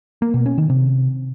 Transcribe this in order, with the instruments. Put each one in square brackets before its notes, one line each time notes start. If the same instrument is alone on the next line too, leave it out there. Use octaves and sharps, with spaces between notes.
[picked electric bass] A#3
B2
C#4
D#3
C3